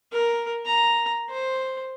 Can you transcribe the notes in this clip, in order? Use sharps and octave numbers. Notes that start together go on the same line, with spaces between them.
A#4
A#5
C5